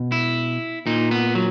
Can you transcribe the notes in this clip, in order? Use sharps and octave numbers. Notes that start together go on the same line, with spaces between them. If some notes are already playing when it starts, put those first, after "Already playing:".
Already playing: B2
E4
A#2 D#4
B3
F#3